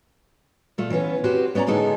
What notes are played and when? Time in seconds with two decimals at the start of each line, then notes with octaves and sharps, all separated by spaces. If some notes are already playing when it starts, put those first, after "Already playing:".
0.78 A#2 A3 F4
0.90 E3 B3 C#4 B4
1.24 C4 F#4 G4 B4 C5
1.55 B3 C#4 D5 G5 A#5
1.67 A2 D3 G#3 B3 D#4 A4